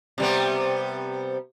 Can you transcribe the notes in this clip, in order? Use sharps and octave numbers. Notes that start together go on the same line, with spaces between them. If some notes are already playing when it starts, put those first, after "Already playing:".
C3 G3 B3